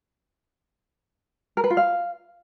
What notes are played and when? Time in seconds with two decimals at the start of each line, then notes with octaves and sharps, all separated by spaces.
1.57 A#4
1.64 B4
1.70 F4
1.77 F5